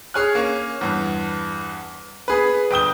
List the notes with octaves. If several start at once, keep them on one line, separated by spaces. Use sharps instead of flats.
G#4 C#5 G#5 F6 F#6
A#3 C#4
E2 G2
B3 G#4 B4
G1 G5 D#6 G7